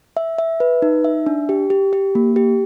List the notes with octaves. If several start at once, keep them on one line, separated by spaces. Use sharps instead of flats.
E5
E5
B4
D#4
E5
D4
G4
G4
G4
A#3
G4